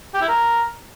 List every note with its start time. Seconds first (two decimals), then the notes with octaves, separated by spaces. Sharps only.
0.14 G4
0.21 E4
0.29 A#4